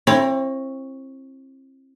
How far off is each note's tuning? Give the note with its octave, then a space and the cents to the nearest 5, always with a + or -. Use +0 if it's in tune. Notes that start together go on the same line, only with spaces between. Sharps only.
C4 +35 E4 +25 C#5 +0